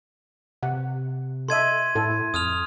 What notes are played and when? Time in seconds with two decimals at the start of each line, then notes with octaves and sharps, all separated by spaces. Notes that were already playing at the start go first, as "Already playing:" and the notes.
0.63 C3 F#5
1.49 A4 D#5 E5 C6 G#6 D#7
1.95 A2 E4 A4
2.34 F2 D#6 F6 F7